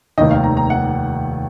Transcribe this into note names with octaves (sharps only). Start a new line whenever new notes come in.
F1 D#2 D#3 D#5
F5
A#5
A#5
F#5